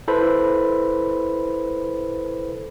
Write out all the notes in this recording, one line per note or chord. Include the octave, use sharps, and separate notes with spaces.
E4 A4 B4 C5 B5